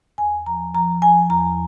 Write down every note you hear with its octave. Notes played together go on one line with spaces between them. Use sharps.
E2 G#5
F3 A#5
F3 A#5
F3 G#5
E2 A#5